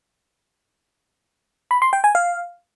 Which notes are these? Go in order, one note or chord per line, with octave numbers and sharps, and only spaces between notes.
B5
C6
G5
G#5
F5